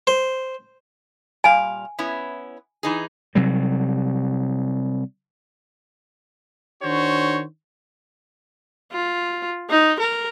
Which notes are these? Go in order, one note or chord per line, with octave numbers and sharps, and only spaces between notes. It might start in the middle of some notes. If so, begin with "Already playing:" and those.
C5
A#2 G3 F5 G#5
B3 C#4 E4
E3 D#4 G#4
C3 F#3 G3
D#3 D4 F#4 C5 C#5
F4
D#4
A#4